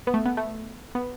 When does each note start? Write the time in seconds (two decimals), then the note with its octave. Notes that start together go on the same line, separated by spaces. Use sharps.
0.07 B3
0.14 A3
0.25 B3
0.37 A3
0.95 B3